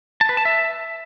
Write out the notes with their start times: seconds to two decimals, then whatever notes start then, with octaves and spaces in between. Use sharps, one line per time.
0.21 A5
0.29 B4
0.37 A5
0.45 E5